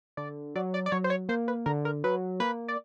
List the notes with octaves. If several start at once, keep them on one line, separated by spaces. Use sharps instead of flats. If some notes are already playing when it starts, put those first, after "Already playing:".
D3 D5
F#3 D5
D5
D5
F#3 C#5
C5
C#5
A#3 C5
B4
D3 A#4
A#4
F#3 B4
A#3 B4
D5